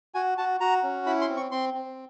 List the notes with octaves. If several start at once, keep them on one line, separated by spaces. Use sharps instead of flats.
F#4 G#5
F#4 A5
F#4 A#5
C#4
E4 B5
C6
C4
C#6
C4 C6
C4